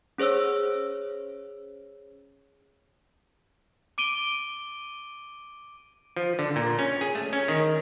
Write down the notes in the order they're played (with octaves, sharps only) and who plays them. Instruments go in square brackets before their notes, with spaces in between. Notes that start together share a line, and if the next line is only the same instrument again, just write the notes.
[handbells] C#4 G#4 C5 C#5 E6
[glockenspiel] D6 D7 D#7 G7
[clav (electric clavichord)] F3
D3
A#2
C#4
G#4
A3
C#4
D#3